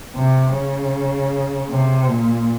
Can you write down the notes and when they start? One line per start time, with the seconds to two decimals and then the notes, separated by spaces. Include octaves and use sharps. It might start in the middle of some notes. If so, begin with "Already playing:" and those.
0.16 C3
0.54 C#3
1.70 C3
2.08 A#2